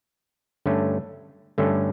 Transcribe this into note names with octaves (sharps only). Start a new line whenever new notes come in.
G2 D3 A3 C#4
G2 D3 A3 C#4